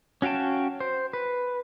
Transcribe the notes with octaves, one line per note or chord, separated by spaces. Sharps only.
C#4 F#4 F5 G5 A5
C5
B4